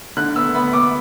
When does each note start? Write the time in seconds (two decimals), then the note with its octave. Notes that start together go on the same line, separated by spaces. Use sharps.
0.17 D3 F#6
0.36 B3 E6
0.54 B3 B5
0.73 B3 D6